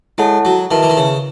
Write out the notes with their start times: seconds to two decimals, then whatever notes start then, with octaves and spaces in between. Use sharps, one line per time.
0.18 G#3 E4 A4 C#5 F#5 A5
0.45 F#3
0.71 D#3 E4 B4 E5 A5
0.83 E3
0.90 D#3
0.97 C#3